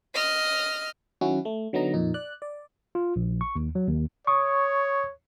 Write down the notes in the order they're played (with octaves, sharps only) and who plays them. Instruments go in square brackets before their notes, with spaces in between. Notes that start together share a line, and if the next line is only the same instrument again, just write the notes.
[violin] D#5 F6
[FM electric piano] D#3 F#3 C#4 E4 F#4
A3
D3 F#3 B3 D#4 A#5
F2 A#2 D#4
D5 F#6
D5
[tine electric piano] F4
A#1
C#6
D#2
F#3
D#2
[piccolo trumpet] C#5 [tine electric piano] C#6 D#6